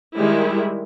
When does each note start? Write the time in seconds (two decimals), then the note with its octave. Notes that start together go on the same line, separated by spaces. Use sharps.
0.14 D#3 G3 G#3 E4